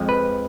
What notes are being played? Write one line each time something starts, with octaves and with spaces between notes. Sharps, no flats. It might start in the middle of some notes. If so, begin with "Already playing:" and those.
Already playing: F2 F3 G#3
B4